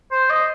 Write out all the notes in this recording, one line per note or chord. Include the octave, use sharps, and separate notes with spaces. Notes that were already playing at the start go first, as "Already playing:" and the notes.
C5
D#5